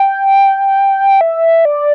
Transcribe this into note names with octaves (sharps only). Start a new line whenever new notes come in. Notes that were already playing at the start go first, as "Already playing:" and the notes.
Already playing: G5
E5
D5